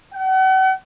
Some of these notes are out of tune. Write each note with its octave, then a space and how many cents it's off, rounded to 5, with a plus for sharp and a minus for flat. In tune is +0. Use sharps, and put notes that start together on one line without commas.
F#5 +40